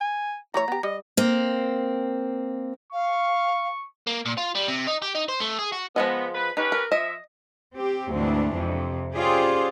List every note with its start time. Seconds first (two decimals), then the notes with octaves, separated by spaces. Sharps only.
0.01 G#5
0.54 E3 A3 C#5 A#5
0.68 B3 G4
0.83 G3 D#5
1.17 A#3 C4
2.92 F5 C#6
4.07 A#3
4.26 A#2
4.37 F4
4.55 G3
4.68 C3
4.87 D#4
5.02 G4
5.15 D#4
5.29 C5
5.40 A3
5.59 G#4
5.72 F#4
5.96 F3 G#3 B3 D#5
6.34 B4
6.57 C#4 D#4 G4 B4
6.72 A#4
6.92 F3 D#5 E5
7.75 C4 G4
8.12 D2 G#2 E3 G#3 C4 D4
8.56 F2 C3
9.15 C#4 F4 G4 G#4 C5 D5